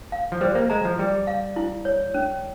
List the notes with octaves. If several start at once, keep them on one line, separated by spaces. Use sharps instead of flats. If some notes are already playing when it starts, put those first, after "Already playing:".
F5
F3
G3 C5
A#3
G#3 A#5
F3
G3 G#4
F5
E4
C#5
C#4